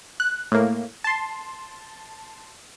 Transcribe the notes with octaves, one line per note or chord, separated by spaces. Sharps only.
F#6
A2 A#3
A5 C6